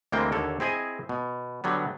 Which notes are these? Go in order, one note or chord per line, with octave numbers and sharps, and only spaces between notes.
D2 E3 G#3 A#3 C4 G5
D#2 D3 A4 C#5
C4 E4 G#4 D#5 G#5
B2
D3 F#3 G3 B3